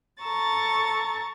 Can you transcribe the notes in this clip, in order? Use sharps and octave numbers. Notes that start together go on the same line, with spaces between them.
A4 A#5 C#6 A6